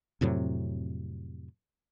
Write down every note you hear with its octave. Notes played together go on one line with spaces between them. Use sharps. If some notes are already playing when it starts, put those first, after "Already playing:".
F2 A2 C3 F#3